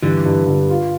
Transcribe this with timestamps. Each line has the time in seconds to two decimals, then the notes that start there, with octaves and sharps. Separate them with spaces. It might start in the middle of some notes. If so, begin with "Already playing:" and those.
0.02 G2 D3 E3
0.26 G2
0.47 D3
0.70 F4